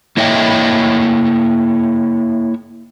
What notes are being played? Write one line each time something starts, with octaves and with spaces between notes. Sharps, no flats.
A#3 E4 C#5 D#5 E5 G5